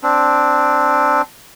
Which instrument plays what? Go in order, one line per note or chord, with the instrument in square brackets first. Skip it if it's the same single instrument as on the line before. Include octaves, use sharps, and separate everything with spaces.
[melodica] C4 D4